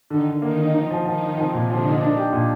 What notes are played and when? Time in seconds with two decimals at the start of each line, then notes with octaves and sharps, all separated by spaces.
0.10 D3 D#3 D#4
0.27 D3
0.42 D#3 A#3 D#4
0.58 D#4
0.74 F3 D#4 F4
0.91 F3
1.05 D#3 F3 D#4
1.22 D#4
1.37 C3 F3 C4
1.53 A#2
1.69 D3 F3 D4
1.85 D#4
2.01 A#2 A#3 D4
2.17 G4
2.33 A#2